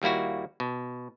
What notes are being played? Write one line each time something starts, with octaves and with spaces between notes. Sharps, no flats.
D#2 G3 A#3 E4 F#4
B2